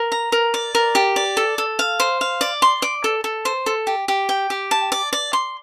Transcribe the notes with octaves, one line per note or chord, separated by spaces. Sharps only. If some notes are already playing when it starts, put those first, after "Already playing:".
Already playing: A#4
A#5
A#4
D5
A#4
G4
D5
A4
A4
F5
C5
F5
D5
C6
D5
A4
A4
C5
A4
G4
G4
G5
G4
A5
D5
D5
C6